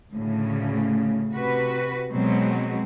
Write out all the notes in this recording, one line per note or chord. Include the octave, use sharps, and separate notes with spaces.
D2 A2 C#3
C3 F#4 B4
B2 F#3 G#3 C4